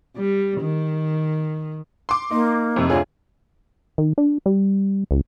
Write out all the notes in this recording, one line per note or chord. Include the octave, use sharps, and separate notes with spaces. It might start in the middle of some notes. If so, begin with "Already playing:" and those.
G3
D#3
C6 D6
A#3 D#4
F2 C3
D2 F4 G#4 C#5
D#3
D4
G3
C#2